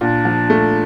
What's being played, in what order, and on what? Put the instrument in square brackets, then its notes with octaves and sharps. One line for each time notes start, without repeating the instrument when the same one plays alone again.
[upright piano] A#2 [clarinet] D4
[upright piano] F3
A3